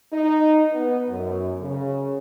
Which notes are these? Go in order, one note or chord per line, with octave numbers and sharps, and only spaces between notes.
D#4
B3
F#2
C#3